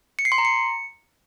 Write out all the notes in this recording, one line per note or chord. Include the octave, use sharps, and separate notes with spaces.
C#7
C7
C6
A#5
C#7